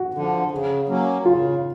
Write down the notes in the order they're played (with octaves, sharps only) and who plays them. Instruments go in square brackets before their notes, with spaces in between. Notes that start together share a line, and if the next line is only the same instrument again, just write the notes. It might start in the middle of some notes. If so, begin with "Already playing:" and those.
Already playing: [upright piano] F#4
[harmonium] D3 F3
C#3
F#3 A#3 C#4
[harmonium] C#3 [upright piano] F4